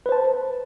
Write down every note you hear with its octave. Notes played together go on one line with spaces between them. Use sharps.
B4 C5 A5